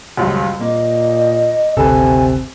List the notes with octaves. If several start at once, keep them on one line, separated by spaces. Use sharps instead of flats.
D#1 C#2 F#2
A#2 A#3 D#5
G#1 D2 C3 A4 B4 G#5